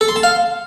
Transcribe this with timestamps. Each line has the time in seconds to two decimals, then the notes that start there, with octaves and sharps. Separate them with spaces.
0.01 A4
0.08 C6
0.16 A5
0.23 F5